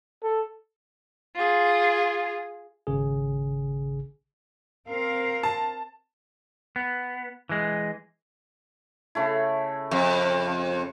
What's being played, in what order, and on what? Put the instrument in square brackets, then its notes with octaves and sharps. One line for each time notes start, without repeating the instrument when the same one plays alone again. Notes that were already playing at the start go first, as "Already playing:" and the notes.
[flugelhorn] A4
[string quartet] F4 G#4
[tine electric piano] G#1 C#3 G#4
[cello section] C4 A#4 F5
[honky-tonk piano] A5
[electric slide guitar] B3
E3 G#3
[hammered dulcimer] C#3 A3 E4
[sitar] F2